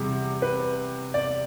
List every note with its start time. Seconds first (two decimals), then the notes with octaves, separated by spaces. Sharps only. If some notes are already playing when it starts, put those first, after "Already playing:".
Already playing: E2 C3 G3
0.42 B4
1.14 D5